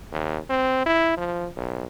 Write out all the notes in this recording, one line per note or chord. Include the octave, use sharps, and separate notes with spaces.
D#2
C4
E4
F3
B1